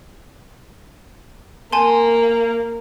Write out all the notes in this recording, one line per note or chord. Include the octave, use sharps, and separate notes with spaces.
A#3 G#5 A5 C6